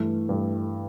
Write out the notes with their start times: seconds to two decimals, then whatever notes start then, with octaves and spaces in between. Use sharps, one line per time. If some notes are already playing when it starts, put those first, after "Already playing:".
Already playing: G2 E3 A3
0.29 G2 E3 A3